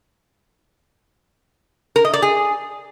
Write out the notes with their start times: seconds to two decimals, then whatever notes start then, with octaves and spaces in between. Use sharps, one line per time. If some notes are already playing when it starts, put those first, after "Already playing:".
1.96 A#4
2.05 D#5
2.13 D5
2.22 G#4